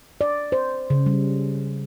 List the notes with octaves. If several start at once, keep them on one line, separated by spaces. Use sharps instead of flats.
D5
C5
C#3
G3